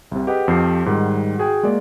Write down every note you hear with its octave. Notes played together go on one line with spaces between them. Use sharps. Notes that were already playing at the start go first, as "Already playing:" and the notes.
C2 C3
G4 G#4 B4 D#5 F#5 G5
F2 F3 G4 C7
G#2 D#3 G3 F#5
F#4 G#4 G5 G#5
G#3 A#3 D5